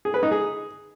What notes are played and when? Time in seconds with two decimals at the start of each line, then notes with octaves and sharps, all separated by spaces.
0.05 G#4
0.14 B4
0.23 D#4
0.32 G#4